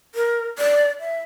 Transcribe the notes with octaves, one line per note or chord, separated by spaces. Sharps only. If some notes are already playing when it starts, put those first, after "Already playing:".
A#4
D5
E5